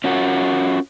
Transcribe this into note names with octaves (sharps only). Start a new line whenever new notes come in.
C#4 F4 F#4 A#4